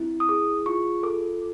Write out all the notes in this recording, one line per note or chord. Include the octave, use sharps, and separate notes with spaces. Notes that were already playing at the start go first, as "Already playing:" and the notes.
Already playing: C4 E4
D#6
G#4 D6
F4 C#6
A4 D6